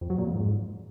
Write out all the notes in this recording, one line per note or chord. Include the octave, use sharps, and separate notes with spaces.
F2
F#3
A#2
F2
G#2